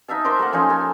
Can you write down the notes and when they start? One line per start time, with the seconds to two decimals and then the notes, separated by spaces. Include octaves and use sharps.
0.08 D#4 E5 F5 A5
0.24 A#4 C5 C6 D6
0.39 A3 A#3 F#5
0.53 F3 C#4 D#4 F5
0.69 A#3 A4 G#5